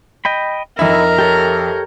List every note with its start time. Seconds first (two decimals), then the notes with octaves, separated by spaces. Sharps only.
0.25 D#5 G5 B5
0.79 F2 D#4 E4 A#4 E5
1.19 G4 A4 C#5